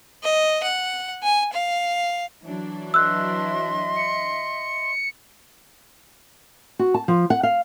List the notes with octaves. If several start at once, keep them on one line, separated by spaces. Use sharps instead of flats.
D#5
F#5
G#5
F5
E3 F#3 D4
D#5 E5 C6 E6 F#6
C#7
F#4
A5
F3
F#5
F5